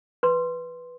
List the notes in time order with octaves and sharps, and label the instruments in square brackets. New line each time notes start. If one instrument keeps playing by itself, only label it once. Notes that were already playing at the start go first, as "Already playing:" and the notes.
[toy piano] B4 C6